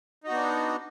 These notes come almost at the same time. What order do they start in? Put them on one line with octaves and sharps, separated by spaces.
D#4 F#4 B3 D4